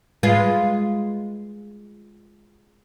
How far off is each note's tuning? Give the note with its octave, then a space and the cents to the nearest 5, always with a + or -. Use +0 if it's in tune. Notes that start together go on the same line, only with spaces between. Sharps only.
G#3 +0 F4 +0 B4 +0